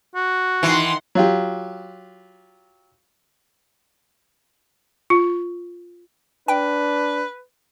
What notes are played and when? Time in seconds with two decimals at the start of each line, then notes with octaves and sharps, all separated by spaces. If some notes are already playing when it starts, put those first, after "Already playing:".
0.15 F#4
0.63 D#3 E3 F#5 C6
1.15 F#3 F4 G4
5.10 F4
6.48 D4 B4 G5